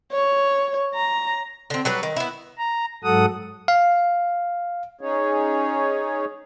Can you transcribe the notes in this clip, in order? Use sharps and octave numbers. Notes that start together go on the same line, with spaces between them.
C#5
A#5
D3 C4
F#3 G3 B4
D#3
B3 E4
A#5
G#2 F#3 A4 F#5 D#6
F5
C#4 D#4 G#4 C#5